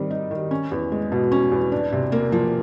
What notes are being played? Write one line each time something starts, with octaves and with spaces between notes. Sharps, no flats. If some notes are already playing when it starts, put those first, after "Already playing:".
Already playing: D#3 G3 C4
D#4
D#3
C#4
E2
G#3
B2
C#4
E2
D4
C3
A#3
F3